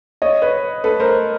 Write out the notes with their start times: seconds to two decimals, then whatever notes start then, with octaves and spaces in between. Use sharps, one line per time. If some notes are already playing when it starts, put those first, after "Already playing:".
0.22 C#5 D#5
0.42 B4 C#5
0.84 A4 B4
1.00 A#4 C5